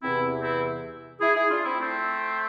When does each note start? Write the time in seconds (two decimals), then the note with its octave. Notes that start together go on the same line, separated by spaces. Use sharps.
0.03 E2 C3 E3 C4 E4
0.42 C4 E4
1.20 E4 G#4
1.35 E4 G#4
1.50 D4 F4
1.65 C4 E4
1.79 A3 C4